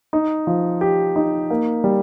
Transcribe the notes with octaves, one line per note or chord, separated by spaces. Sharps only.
D#4
F3
G4
D#4
A#3
G3